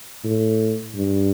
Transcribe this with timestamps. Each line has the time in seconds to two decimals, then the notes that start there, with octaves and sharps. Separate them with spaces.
0.25 A2
0.96 G2